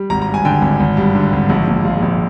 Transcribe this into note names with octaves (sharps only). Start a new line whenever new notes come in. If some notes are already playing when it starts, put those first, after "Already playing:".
Already playing: G3
G#1 A#5
A#5
G2
G#5
D3 G5
G#1
G#1
G2
D3
G#1
A#1
A#2
G#3 F5
A#1